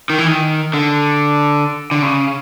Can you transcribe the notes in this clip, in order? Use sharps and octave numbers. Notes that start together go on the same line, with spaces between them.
D#3
E3
D#3
D3
D3
C#3